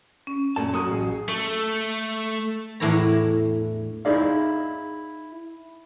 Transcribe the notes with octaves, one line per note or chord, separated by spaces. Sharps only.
C#4
F#2 A#2 A3 A5
F#3 A#5 D#6
A1 G#4
A3
E2 A2 D4 E4 C#5 A#5
D#4 E4 G#4 D5 F5